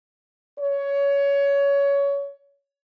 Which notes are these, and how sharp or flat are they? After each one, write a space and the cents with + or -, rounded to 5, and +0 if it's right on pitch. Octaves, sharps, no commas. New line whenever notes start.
C#5 +20